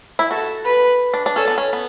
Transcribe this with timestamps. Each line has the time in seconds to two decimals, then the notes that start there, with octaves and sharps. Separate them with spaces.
0.19 E4
0.31 F#4 A4
0.66 B4
1.14 D4
1.26 D4
1.36 C#4 A4
1.48 B3
1.58 C#4
1.73 B3